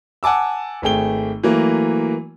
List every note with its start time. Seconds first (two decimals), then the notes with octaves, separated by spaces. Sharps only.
0.23 F#5 G#5 A5 D6 E6
0.82 G#1 A3 G#4 G5 G7
1.43 E3 F#3 A3 A#3